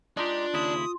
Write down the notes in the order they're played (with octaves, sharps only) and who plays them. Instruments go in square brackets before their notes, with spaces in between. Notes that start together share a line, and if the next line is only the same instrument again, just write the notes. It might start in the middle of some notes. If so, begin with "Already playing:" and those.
[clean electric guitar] G#3 D#4 G4 [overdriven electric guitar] D4 [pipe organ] F4
[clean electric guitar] D#2 C#3 E4 [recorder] D#6